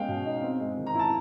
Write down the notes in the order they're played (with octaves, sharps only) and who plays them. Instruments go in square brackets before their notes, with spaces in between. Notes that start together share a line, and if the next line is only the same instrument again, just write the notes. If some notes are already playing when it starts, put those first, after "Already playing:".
Already playing: [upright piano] G#3 B3 C#4 F5 G5
B2
D#4
C4
G#3
D#3
A#5
E4 A5